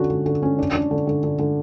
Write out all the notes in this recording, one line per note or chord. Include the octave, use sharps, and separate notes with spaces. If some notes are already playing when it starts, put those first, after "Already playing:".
Already playing: D3 C#4 F#4
D3
D3
C#4
D4
D4
D3
D3
D3
D3